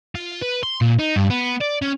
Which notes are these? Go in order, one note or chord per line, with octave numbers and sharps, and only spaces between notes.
F4
B4
C6
A#2
D#4
G2
B3
D5
C#4